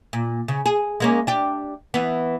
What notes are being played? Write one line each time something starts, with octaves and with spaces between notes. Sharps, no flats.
A#2
C#3
G#4
G#3 A#3 C#4
D4 G4
E3 B3